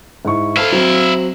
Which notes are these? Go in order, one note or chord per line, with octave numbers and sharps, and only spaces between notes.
G#2 E4 C#6
E4 A4 C5 F5
F#3 C4